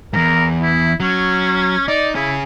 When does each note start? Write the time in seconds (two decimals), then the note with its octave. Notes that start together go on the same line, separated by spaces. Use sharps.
0.13 E2 G#2 A#4
0.61 E4
1.00 F#3 C#4
1.88 D#4 D5
2.15 C#4 E4 G#4